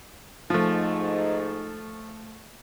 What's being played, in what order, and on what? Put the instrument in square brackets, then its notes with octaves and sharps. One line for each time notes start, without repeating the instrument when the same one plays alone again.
[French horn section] G#2 D#4 [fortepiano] F3 A3